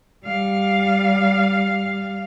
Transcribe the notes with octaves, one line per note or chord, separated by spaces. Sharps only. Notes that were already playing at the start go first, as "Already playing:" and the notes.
G3 F5